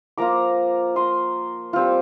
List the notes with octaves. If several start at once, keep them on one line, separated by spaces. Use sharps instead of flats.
F3 A#3 F4 A#5 D6
C6 D#6
G3 C4 F4